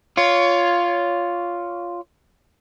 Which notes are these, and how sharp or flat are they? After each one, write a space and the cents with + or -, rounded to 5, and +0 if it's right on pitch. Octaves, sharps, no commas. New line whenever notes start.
F4 +0 C#5 +20